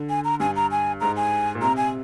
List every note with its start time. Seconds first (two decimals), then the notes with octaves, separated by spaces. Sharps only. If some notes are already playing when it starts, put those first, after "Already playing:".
Already playing: D3
0.10 G#5
0.24 A#5
0.40 G2 G#5
0.56 A#5
0.71 G#5
1.01 G#2 A#5
1.17 G#5
1.55 A#2
1.61 C3 A#5
1.77 G#5